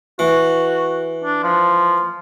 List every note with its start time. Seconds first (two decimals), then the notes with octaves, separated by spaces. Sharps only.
0.19 E3 F#4
1.25 D4
1.43 F3